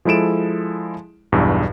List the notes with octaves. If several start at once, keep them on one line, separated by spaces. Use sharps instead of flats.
F3 G#3 E4 A4 D7 E7
B1 E2 G2